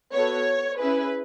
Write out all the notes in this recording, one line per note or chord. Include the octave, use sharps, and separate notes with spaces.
B3 F#4 A4 C#5
C#4 E4 G#4 B4